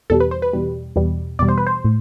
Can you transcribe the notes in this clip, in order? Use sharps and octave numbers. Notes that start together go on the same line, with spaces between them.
E2 B2 G3 A4
B4
C5
B4
E2 B2 G3
E2 B2 G3
E2 B2 G3 D5
C5
B4
C5
A2